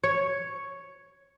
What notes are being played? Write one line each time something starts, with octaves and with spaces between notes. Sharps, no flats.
C#5